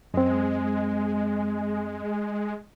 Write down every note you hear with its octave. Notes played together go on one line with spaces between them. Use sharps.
F#2 G#3 C4